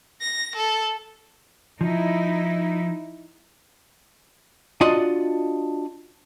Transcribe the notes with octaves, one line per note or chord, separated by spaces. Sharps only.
A#6
A4
F3 D#4 E4
D4 F4 F#4 D5 D#5